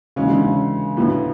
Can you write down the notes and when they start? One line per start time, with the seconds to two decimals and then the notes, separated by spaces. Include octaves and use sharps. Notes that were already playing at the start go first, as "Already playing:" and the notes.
0.16 C#3 E3 G#3 C#4 F#4
0.29 D3
0.41 C#3
0.97 A2 D3 F#3 B3